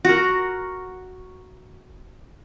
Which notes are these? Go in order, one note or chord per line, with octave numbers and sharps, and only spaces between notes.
F#4 A#4